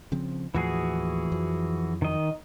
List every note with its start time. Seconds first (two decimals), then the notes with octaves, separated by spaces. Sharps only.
0.12 C#3 F3 C4
0.55 D#2 A2 E3 F3 F#4 G#4
1.32 F2 F3 F#3
2.02 D#3 D#5